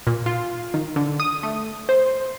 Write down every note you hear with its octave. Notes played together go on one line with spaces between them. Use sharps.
A#2
F4
D#3
D3
D#6
A3
C5